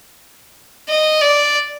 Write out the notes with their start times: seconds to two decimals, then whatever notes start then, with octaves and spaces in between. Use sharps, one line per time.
0.89 D#5
1.21 D5